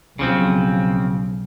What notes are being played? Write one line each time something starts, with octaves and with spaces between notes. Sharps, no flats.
B1 C#3 F3 C4